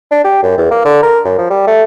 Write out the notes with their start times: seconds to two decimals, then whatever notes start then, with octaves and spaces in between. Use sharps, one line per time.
0.11 D4
0.24 G4
0.43 F#2
0.58 E2
0.71 A#3
0.85 D3
1.03 A#4
1.25 F#2
1.38 F3
1.50 G3
1.67 A3